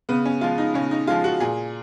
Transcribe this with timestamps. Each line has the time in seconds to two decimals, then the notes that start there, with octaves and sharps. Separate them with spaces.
0.09 C#3 B3
0.25 C#4
0.41 F3 G#3 F4
0.58 D#4
0.74 C#3 C#4
0.91 D#4
1.07 F3 G#3 F4
1.24 F#4
1.40 A#2 G#4